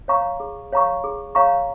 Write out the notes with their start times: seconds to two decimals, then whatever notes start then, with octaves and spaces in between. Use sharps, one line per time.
0.08 C#5 F5 A#5 C#6
0.40 G#4
0.72 C#5 F5 A#5 C#6
1.04 G#4
1.35 C#5 F5 A#5 C#6